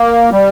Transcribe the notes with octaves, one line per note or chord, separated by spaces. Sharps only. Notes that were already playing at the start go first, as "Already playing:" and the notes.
Already playing: A#3
G3